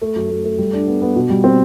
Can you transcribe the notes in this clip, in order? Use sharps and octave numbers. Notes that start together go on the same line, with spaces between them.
A3
F#2
A3
A3
G3
D4
B3
B3
B2
G3
C4